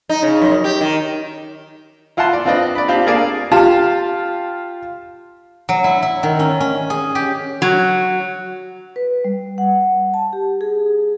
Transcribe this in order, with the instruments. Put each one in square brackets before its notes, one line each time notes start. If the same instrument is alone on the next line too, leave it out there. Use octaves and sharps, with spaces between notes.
[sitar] D#4
C#3
F#2
G4
D#3
[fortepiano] E4 F4 F5 F#5 A5 C6
D5
C4 D4 F4 B4 D5 D#5
D5 B5
C4 D4 F4 G4
G#4 A#4 D5 F5 G#5 A5
F4 G4 A5
[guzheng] F#3
E4
E4
D#3
C#4
C#4
G#4
G4
[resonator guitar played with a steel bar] F#3
[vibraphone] B4
G3
F#5
A5
G4
G#4